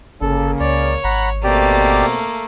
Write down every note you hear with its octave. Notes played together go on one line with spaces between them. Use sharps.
G1 C#3 A#3 A4
C#2 C#5 D5
G#1 F#5 A#5 B5
B2 A3 A#3 C4 G4 D5